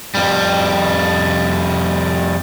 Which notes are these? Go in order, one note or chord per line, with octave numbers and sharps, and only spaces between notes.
F2 G3